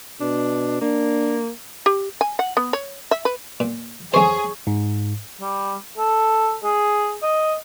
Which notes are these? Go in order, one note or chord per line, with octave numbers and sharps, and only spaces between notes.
B2 D4
A#3 D4
G4
G#5
F#5
B3
C#5
E5
B4
A#2
F2 G#4 C5 C#5
G#2
G3
A4
G#4
D#5